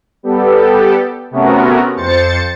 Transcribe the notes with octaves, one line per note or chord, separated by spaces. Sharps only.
G3 B3 G4 A4
C3 A3 B3 C#4 F#4 A#4
F2 C5 A6 C#7